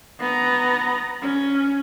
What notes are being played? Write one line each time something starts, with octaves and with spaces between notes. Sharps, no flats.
B3 A#5
C#4